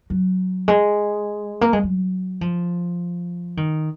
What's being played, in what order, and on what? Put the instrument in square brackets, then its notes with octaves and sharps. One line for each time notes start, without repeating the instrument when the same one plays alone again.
[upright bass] F#3
G#3
A#3
G#3
F#3
F3
D#3